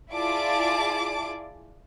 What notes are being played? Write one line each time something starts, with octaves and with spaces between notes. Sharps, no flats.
E4 F4 G#4 D5 A5 D6